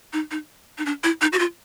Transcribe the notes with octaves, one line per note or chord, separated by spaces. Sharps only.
D#4
D#4
D#4
D4
E4
D#4
F#4
F4